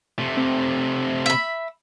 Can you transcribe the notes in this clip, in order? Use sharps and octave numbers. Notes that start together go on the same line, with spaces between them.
C3 A3
C4
E5 B5